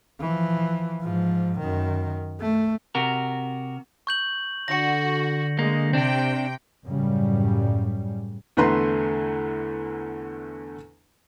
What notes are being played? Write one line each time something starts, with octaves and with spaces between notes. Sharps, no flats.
E3 F3
G#2 F3
F#2 D#3
A3
C3 F#4 A#4
C#6 G6 F#7
D3 F#4 A#6 C#7
G#3 A#3
C3 C4 D4 G5
F#2 A2 C#3 G3
E2 D3 A3 B4 A#5 C6